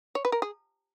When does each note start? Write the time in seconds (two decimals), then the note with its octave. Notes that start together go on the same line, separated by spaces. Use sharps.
0.15 C#5
0.25 B4
0.32 A#4
0.42 G#4